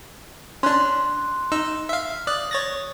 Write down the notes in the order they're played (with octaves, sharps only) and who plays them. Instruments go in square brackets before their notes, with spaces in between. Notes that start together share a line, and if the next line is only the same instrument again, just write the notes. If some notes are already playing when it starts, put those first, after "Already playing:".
[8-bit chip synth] C#4 D4 [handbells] C6 F#6
[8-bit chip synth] D#4 E6
E5 F5
[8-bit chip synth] D5 F#6 [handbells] D#6
[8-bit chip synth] C#5 A6 A#6